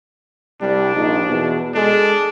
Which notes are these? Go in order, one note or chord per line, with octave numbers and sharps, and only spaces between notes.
C2 G3 D4
A#1 D#4
E2 B2
G#3 D4 A4